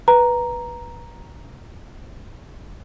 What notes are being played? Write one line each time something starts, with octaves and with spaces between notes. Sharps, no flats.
B4 A#5